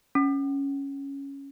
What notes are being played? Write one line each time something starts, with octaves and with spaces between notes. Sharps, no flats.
C#4